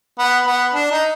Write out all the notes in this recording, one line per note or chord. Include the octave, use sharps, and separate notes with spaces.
B3
B3
D4
D#4